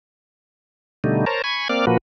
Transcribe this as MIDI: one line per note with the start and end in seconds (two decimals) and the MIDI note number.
1.04 1.25 47
1.04 1.25 50
1.04 1.25 55
1.04 1.25 57
1.04 1.25 63
1.26 1.42 70
1.26 1.42 72
1.26 1.42 73
1.26 1.42 81
1.26 1.42 82
1.44 1.68 80
1.44 1.68 83
1.44 1.68 85
1.44 1.68 92
1.69 1.85 58
1.69 1.85 60
1.69 1.85 74
1.69 1.85 86
1.69 1.85 89
1.87 1.97 46
1.87 1.97 53
1.87 1.97 58
1.87 1.97 66
1.87 1.97 71